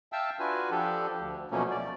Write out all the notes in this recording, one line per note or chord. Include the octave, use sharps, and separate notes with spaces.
E5 F5 G5 A5 E6
D4 F4 F#4 B4 G#5
F3 D4 G4 A4
D2
B2 F3 F#3 A3 A#3 C#4
D5